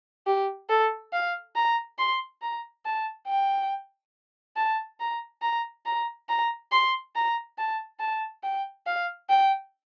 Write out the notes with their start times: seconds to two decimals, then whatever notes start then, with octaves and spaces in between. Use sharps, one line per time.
0.27 G4
0.69 A4
1.12 F5
1.55 A#5
1.98 C6
2.42 A#5
2.85 A5
3.27 G5
4.56 A5
5.00 A#5
5.42 A#5
5.86 A#5
6.29 A#5
6.72 C6
7.15 A#5
7.58 A5
8.00 A5
8.43 G5
8.86 F5
9.29 G5